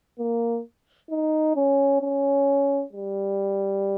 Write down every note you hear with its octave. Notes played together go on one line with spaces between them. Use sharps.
A#3
D#4
C#4
C#4
G3